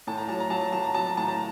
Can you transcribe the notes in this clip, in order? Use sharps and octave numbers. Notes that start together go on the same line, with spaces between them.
A2 A5
A#5
F#3 A5
A#5
F#3 A5
A#5
F#3 A5
A#5
F#3 A5
A#5
A2 A5
A#5